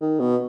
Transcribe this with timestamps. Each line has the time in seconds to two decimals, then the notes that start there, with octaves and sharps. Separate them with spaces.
0.01 D#3
0.20 B2